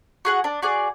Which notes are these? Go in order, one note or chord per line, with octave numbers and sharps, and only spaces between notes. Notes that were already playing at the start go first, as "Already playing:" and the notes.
F#4 G#4 F#5
D4
F#4 G#4 D5